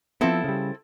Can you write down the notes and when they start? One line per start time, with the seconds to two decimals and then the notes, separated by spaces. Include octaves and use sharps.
0.21 F3 B3 C4 E4 A4
0.44 C#3 G3